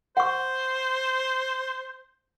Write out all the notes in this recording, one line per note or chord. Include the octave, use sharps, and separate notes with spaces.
C5 F#5 C#6